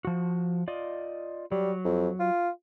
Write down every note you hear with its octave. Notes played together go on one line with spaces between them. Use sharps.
F3 F#4
F4 D5 D#5
F#3 G3
F2
F4